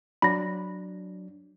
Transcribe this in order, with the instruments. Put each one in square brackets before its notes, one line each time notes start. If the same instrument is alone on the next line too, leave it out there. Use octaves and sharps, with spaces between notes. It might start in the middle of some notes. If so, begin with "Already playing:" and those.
[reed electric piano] F#3 D4 [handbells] B5 A#6